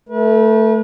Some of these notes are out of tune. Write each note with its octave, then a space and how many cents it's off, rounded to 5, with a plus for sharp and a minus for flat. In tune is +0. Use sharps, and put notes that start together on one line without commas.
A3 +0 B4 -40